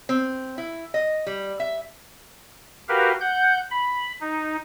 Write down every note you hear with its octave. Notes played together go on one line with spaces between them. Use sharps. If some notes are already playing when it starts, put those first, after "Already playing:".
C4
E4
D#5
G3
E5
F#4 G4 A#4 B4 F5
F#5 G6
B5
D#4